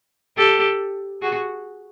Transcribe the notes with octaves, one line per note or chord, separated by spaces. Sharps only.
G4 A4
F#4 G#4